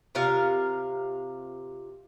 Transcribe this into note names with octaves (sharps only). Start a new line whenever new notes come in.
C3 F4 A#4 F5